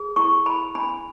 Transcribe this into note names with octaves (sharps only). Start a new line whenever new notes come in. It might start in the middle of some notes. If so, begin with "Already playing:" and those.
Already playing: G#4
E4 C#6
E4 B5
D4 B5